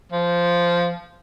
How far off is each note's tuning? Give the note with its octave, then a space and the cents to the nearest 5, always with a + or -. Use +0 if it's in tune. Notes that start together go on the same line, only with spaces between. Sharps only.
F3 -10